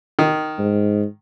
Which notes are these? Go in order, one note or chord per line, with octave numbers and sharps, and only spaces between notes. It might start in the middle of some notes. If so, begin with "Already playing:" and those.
D#3
G#2